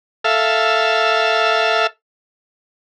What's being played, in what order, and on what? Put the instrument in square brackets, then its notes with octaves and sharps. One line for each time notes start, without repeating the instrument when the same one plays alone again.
[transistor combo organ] A4 E5 F5